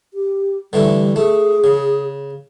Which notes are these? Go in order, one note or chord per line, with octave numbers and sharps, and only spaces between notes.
G4
D3 E3 G3 A3
A3 G#4
C#3